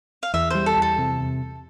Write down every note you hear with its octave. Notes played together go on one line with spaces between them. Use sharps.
F5
E2 E5
G3 C5
A4
E2
A4
C3